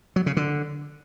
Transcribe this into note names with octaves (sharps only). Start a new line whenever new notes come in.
F#3
C#3
D3